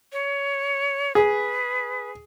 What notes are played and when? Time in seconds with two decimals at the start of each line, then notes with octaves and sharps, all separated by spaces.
0.13 C#5
1.15 G#4 B4